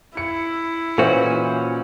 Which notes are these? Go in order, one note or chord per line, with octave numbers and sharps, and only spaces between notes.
E4 C#7
A#2 E3 C#4 F#4 C5